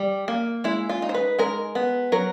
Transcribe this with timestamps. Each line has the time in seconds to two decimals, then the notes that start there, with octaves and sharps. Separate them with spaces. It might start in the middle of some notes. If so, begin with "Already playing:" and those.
Already playing: G3
0.28 A#3
0.64 G#3 E4
0.89 F4
1.02 D#4
1.09 C5
1.14 B4
1.39 G#3 A#4
1.75 B3
2.12 F#3 A#4